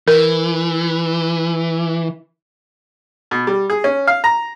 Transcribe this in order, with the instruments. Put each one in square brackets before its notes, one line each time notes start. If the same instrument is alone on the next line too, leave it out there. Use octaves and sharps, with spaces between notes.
[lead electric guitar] E3 [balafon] A#4
[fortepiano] B2
G3
G#4
C#4
F5
A#5